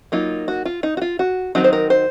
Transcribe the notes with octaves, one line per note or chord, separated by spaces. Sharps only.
F#3 A#3 D#4 F4
F#4
F4
D#4
F#4
F4
F#4
D#3 F#3 C4 D#4 F#4
C5
A#4
C5